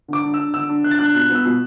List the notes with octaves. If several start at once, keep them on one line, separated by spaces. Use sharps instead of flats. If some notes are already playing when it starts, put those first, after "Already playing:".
D3 D6
D4
E6
D4
D3 E6
D4
D3 F#6
A6
D4 F#6
B2 F#6
B3
E6
B2